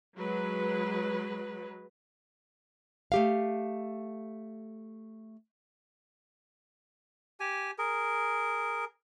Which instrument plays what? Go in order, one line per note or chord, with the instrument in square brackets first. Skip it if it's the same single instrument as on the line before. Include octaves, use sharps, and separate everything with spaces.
[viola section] F#3 G#3 B4
[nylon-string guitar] A3 G4 F5
[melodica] G4 G#5
G#4 A#4